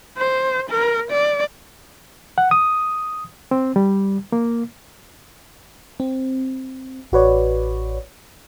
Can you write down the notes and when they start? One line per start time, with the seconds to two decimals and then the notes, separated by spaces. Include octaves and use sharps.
0.17 C5
0.70 A#4
1.11 D5
2.38 F#5
2.51 D#6
3.51 C4
3.76 G3
4.32 A#3
6.00 C4
7.12 A1 F#4 B4 C#5 D5